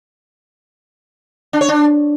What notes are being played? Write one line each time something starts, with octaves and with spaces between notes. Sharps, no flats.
D4
C#5
D4